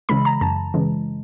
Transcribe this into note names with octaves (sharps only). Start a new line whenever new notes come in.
C#3 E3 G#3 B5
A#5
F#2 A5
C#3 E3 G#3